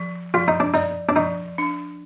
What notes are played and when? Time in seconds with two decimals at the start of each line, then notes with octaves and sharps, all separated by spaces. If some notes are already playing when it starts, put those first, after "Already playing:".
Already playing: F3
0.34 F3 F4
0.48 D#4
0.60 D4
0.74 D#4 D5
1.09 D4
1.16 F3 D#4
1.58 D4